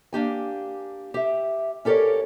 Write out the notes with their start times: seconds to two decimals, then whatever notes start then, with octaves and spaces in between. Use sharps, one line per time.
0.13 A#3 D4 G4 G#5
1.14 G4 E5
1.85 C#4 G4 A4 A#4 C#5 D5